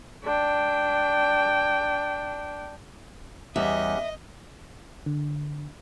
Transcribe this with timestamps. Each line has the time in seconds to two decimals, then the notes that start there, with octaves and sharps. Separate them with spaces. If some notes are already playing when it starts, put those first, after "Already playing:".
0.24 D4 G5
3.56 E2 G3 C#4 G4 D#5 E5 F#5
5.06 D3